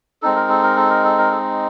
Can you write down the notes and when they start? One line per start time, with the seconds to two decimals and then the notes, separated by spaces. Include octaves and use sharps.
0.22 G#3 C4 D#4 A4
0.36 A#4
0.49 A4
0.63 A#4
0.77 A4
0.90 A#4
1.04 A4
1.18 A#4
1.31 A4